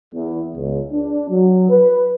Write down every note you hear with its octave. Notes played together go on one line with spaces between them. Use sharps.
E2
C#2
D4
F#3
B4